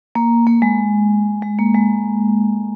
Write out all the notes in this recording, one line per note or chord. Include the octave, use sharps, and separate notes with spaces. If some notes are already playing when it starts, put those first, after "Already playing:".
A#3
A#3
G#3
G#3
A#3
G#3